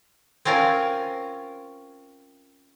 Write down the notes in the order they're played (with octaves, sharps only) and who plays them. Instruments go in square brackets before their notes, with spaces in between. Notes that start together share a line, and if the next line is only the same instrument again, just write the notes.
[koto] C4 C#4 F4 A#4 G#5